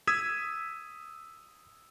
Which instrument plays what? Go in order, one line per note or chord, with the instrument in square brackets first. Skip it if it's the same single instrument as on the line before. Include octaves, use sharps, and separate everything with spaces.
[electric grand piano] D#6 E6 G#6 B6